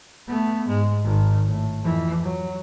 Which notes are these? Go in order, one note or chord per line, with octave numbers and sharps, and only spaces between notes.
A3 B3
G#2 G#3
G#1 D#3
A2
F2 E3
F#3